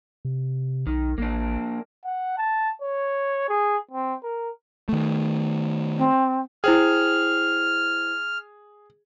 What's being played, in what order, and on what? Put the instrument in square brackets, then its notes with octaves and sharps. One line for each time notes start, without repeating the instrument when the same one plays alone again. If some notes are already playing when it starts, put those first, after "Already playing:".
[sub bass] C3
[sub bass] B1 [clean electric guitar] D#3
[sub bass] A1 [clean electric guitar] A#3 D4
[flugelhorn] F#5
A5
C#5
G#4
C4
A#4
[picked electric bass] D#3 A3
[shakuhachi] C4
[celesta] E4 C5 G5 [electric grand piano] G#4 [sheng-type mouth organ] F6